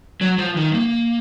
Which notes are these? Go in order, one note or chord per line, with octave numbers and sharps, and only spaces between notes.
F#3
F3
D#3
A#3